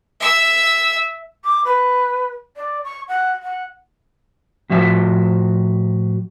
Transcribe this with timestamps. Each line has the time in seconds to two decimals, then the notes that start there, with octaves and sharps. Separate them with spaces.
0.20 E5 E6
1.44 D6
1.65 B4
2.56 D5
2.84 C#6
3.08 F#5
3.43 F#5
4.70 A2 F3 F#4 E5 F5 A5